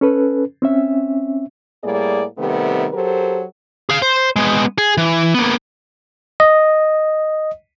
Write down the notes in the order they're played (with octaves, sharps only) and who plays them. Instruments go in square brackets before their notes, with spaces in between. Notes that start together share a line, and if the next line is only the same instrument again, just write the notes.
[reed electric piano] C#4 A4 B4
C4 C#4 E5
[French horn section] A2 G3 A#3 G#4 D5
C3 D#3 G3 A3 B3
F#3 G4 A4 A#4 C5
[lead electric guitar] G#4 F5
C5
G#3 B3
G#4
E3
A#3 B3
[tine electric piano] D#5